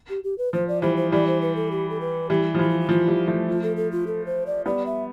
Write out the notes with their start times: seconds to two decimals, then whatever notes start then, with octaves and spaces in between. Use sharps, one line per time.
0.09 G4
0.24 G4
0.38 B4
0.53 F3 C5
0.68 D5
0.82 E3 G3 C5
0.97 C5
1.12 E3 G3 D5
1.27 C5
1.42 B4
1.56 A4
1.71 G4
1.90 A4
2.01 B4
2.30 E3 G3 G4
2.55 F3
2.59 E3 G4
2.69 F4
2.80 E4
2.89 F3 F4
3.08 E3 G3
3.28 F3 A3
3.48 F4
3.63 A4
3.77 A4
3.92 F4
4.07 A4
4.26 C5
4.46 D5
4.66 G3 B3 D5
4.86 E5